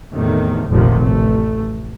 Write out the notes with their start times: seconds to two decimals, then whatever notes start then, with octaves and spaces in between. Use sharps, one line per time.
0.12 E2 A2 C3 D#3 A3
0.69 F1 A#1 F2 C3 D#3 F3
1.00 A1 A3